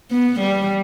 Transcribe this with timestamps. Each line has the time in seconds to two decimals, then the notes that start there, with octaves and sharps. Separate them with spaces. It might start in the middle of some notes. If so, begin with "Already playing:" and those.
0.11 B3
0.40 G3